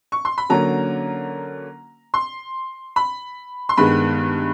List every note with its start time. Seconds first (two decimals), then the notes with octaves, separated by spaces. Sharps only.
0.12 C#6
0.25 C6
0.38 B5
0.50 D3 F#3 A#3 C#4 A#5
2.14 C6
2.96 B5
3.69 C6
3.77 G2 D#3 G#3 B3 B5